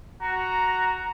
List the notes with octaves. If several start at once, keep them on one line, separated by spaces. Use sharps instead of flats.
F#4 A#5